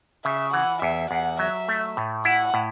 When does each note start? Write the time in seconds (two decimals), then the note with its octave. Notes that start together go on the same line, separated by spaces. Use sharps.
0.25 C#3 E5
0.53 E3 F#5
0.82 E2 E5
1.11 E2 F#5
1.39 F#3 E5
1.68 A3
1.97 A2
2.25 E4 F#5
2.54 A2